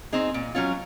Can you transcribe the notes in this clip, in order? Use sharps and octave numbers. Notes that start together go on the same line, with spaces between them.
C4 D#4 G#4
A#2
F#3 C#4 F4